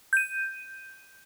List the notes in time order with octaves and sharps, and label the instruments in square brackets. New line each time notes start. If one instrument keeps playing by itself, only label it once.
[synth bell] G6 D#7